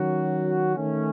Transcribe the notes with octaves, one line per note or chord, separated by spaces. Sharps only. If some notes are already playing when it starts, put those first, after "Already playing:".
Already playing: D#3 F#3 C#4 F#4
D#3 A3 C#4